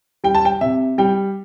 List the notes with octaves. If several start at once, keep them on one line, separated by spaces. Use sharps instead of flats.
G3 G5
A5
G5
C3 E5
G3 G5